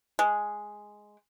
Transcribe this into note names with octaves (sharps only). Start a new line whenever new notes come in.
G#3